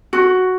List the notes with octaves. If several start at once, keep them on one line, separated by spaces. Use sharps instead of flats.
F#4